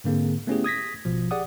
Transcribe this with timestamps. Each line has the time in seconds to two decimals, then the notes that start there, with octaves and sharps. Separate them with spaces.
0.04 G#2 D3 A#3 C4 G#4
0.47 A3 B3 C#4 E4 G4 G#4
0.64 D#6 G#6 A#6 B6
1.05 G#1 B2 F3
1.31 G4 G#4 D5 F#5 D#6